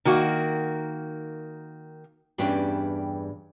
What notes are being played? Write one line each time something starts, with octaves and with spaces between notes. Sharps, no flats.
D#3 A#3 F#4
E2 G2 C#4 D4 G4